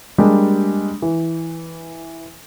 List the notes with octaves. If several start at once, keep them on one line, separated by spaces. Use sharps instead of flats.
G3 G#3 A#3 D4 G4
E3